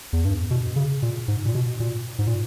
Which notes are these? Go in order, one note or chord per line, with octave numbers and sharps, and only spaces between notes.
E2
G2
B2
C#3
A#2
G#2
A#2
B2
A#2
G#2
A#2